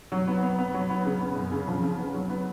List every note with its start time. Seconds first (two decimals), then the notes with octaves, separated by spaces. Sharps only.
0.12 F#3
0.28 B3
0.43 B3
0.59 B3
0.74 F#3
0.90 B3
1.05 C#3
1.21 B3
1.36 F#2
1.52 C#3
1.68 F3
1.83 C#3
1.98 B3
2.14 F#3
2.30 B3